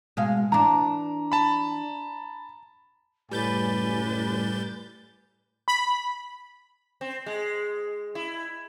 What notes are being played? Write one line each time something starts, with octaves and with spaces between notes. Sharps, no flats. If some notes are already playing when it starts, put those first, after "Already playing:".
B2 G#3 F5
E3 D4 A#5
A5 B5
F#1 A2 G3 B4 G#5 G6 A6
B5
C4
G#3
E4